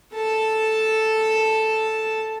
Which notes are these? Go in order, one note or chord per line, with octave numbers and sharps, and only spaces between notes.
A4 A5